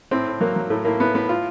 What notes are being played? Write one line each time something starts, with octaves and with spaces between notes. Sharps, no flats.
A2 C4
A2
F#3 A#3
F#3
A2 A3
A2 A#3
A2 B3
A2 B3
F4